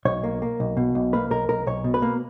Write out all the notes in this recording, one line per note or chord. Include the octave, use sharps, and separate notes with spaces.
B1 C#5
A#3
A#3
B1
B2
B1
A#3 B4
B1 A#4
B1 A#4
B1 C#5
B2
B4
A#3